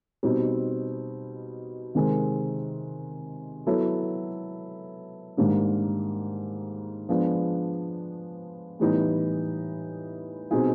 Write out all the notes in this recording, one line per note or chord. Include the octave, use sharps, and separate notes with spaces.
B2 G3 C4 D#4
C3 D#3 G#3 C4
F#3 B3 E4 A4
G#2 D#3 G3 A#3 D4
F3 G#3 B3 D4
A2 E3 G3 B3 D#4
B2 G3 C4 D#4 G#4